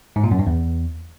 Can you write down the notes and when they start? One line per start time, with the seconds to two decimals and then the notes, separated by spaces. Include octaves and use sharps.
0.16 G#2
0.24 A#2
0.31 F#2
0.39 G2
0.47 E2